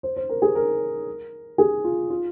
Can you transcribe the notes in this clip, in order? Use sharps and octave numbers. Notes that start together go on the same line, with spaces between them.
C5
C5
A#4
G#4
A#4
G#4
F4
F4